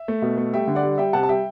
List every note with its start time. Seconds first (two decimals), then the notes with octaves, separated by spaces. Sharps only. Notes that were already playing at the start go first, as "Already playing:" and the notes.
Already playing: E5
0.08 A3
0.22 B2
0.38 A3
0.53 G3 E5 G5
0.68 D3
0.75 D5 F#5
0.83 G3
0.98 G3 E5 G5
1.13 C3 F#5 A5
1.23 A5
1.29 G3 E5 G5